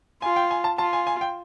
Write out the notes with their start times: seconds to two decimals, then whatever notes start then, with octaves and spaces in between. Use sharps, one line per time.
0.22 F4 G#5
0.36 G5
0.51 G#5
0.64 A5
0.78 F4 A5
0.93 G#5
1.07 G#5
1.21 G5